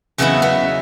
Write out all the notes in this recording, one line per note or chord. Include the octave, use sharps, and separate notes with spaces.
E2 C#3 E3 F#3 D#4 E4
B3